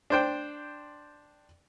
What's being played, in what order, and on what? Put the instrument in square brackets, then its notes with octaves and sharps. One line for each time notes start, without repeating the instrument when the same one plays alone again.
[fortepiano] D4 C5 G5